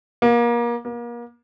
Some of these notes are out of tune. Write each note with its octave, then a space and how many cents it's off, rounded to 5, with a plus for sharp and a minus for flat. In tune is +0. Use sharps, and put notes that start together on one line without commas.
A#3 +30
A#3 +35